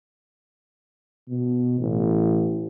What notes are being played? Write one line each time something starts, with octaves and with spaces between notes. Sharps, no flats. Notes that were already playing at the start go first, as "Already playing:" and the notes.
B2
A1